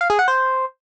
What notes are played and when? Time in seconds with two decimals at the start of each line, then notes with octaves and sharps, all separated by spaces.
0.01 F5
0.10 G#4
0.19 F#5
0.28 C5